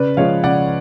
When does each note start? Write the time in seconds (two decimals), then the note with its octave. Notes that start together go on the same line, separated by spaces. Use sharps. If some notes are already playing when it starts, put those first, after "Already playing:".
Already playing: C#3 B4 D5
0.17 F3 G#3 C#5 F5
0.44 C#3 D5 F#5